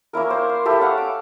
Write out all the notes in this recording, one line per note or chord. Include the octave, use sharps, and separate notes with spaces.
A#3 C#4 E4 A#4
A#3 C5
C6
E4 G4 A4
C#4 F5 F#5
D6